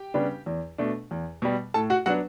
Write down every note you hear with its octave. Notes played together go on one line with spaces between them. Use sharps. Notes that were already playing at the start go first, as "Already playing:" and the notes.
Already playing: G4 G5
C#3 G3 B3 D4
E2
B2 A3 D4
E2
B2 G3
A2 A4 A5
F#4 F#5
F#3 B3 D4 F#4 F#5